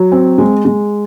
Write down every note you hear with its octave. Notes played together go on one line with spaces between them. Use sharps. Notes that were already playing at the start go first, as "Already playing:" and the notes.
Already playing: F#3
C4
G#3
G#3